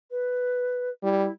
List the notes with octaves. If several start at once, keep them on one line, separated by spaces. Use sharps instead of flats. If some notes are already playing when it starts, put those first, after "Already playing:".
B4
G3 E4